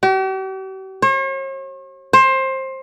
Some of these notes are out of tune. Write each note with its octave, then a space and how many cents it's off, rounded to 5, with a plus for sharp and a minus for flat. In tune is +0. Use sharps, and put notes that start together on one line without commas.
G4 -45
C#5 -45
C5 +20